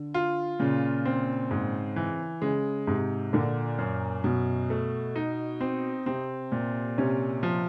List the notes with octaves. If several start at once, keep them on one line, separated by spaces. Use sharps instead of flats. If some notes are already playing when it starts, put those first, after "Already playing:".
Already playing: D3
F4
A#2 C#3
C4
G#2
E3
C#3 G#3
G#2 C3
A#2 D3
F#2
F#2 B2
A3
D#4
C4
C3 C4
A#2
C3 C#4
F3